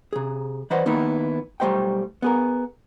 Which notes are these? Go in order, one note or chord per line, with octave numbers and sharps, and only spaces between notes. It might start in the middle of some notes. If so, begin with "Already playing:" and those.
C3 G#4
E3 B4 C5 D5 D#5 F#5
D#3 A#3 B3 D#4 E4
B1 G3 A3 C5 D#5 G5
B3 G#4 A#4